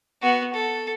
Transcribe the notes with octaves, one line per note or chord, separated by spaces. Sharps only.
B3 F#4
A4